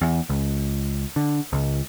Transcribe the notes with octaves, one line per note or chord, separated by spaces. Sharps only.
E2
C#2
D3
C#2